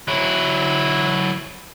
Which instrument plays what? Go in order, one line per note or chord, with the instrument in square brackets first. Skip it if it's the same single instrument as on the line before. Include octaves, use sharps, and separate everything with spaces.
[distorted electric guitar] F#3 E4